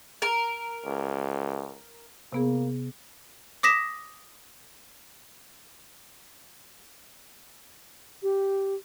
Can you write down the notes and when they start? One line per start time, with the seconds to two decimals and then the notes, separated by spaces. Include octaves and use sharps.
0.22 A#4
0.86 C#2
2.32 C3 A#3 B3 G#4
3.63 D6 D#6 A#6 B6 E7
8.23 G4